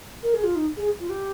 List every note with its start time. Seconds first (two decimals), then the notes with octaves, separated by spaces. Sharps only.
0.23 A#4
0.34 G#4
0.44 F4
0.56 D#4
0.77 G#4
1.00 F4
1.10 G4